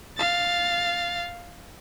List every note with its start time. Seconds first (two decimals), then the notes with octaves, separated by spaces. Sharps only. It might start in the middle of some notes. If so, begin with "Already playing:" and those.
0.17 F5 A6